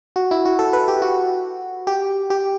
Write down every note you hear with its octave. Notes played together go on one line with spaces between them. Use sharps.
F#4
E4
F#4
A4
B4
G4
F#4
G4
G4